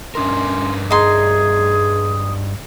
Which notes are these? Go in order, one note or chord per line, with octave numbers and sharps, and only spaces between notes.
G2 C#4 D4 A#4 C6
D#4 G#4 C6 D#6